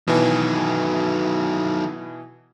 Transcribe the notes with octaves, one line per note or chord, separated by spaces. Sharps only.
B2 D#3 E3 F#3